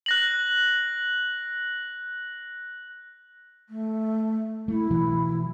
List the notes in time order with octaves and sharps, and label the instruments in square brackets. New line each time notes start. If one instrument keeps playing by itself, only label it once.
[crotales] F#6 A#6 F#7
[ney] A3
[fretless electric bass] A3 [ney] E4
[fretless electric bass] B2 E3 F#3